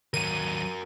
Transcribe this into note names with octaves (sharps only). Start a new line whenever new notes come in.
D#2 F#3 F#4 A#4 D#7